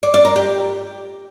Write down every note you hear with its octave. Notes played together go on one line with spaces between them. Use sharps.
D5
D5
A#4
G4